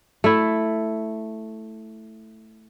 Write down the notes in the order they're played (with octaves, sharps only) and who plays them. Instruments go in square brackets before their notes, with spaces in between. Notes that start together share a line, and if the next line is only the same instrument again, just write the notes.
[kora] A3 E4